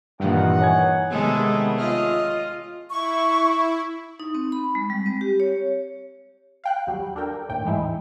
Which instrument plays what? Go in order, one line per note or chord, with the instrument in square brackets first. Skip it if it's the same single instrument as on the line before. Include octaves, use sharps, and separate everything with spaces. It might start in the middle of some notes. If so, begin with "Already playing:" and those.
[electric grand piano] G2 A#2 [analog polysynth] D#3 E3 [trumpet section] D#4 F#5
[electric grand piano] C#5 G#5 G#6
[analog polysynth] C3 D#3 B3 [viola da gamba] G#3 A4 [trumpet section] A3 G#4
[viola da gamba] F4 D#5 [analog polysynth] F6
[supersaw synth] E4 [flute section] C#6
[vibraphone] D#4
C4
B5
G#3
G3
C4
G4
C#5
[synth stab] F5 G5 F#6
D#2 F#3 G3
D4 A4 A#4 G5
D#2 A2 G5
G#2 E3 G#3 D#4 E4